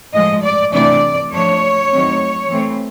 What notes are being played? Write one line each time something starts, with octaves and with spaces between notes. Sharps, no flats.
A2 F3 G#3 D#5
D5
C3 E3 A3 D4 D5
F3 A3 D4 C#5
D#3 F#3 A3 C4
E3 A3 C4